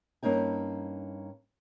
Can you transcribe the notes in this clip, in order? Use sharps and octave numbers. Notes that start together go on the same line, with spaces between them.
G2 A#3 C#4 D#4 G#5